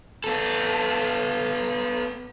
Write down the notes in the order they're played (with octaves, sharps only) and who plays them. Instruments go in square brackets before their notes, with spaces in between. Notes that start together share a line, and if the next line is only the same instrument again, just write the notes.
[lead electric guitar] B3 A4